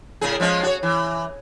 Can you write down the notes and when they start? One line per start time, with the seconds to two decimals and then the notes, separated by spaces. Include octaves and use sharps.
0.21 A2 C#3 G#4
0.40 F3 G#3 C#4
0.63 F#4 C#5
0.83 E3